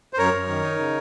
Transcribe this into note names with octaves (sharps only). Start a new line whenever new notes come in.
C5
F#2 A#4 C#5
F#2
D#3
D#4
C#3